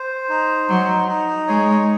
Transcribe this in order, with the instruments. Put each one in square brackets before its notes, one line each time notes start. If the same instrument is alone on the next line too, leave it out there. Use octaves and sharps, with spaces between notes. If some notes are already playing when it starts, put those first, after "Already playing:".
Already playing: [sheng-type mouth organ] C5
D#4
[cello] F#3 [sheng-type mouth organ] D#4
[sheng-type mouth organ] D#4
[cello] G#3 [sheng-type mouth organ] C#5